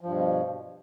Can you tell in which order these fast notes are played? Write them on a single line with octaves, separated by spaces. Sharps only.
F3 G2 B2